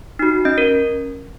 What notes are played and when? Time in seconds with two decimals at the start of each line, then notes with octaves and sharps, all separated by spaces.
0.19 D#4 F#4
0.45 C#4 D#5
0.58 A#4